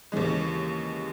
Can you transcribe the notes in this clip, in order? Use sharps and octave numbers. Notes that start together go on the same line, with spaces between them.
D#2 C#3 E3 G#3